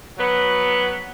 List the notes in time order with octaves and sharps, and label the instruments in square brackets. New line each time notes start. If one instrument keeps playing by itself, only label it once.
[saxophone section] F#3 B3